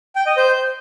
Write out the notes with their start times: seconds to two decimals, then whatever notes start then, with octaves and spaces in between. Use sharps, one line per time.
0.15 G5
0.26 D#5
0.37 C5